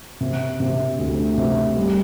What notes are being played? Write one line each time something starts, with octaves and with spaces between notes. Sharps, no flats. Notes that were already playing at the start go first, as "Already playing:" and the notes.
C3
C3
D2
C3
G3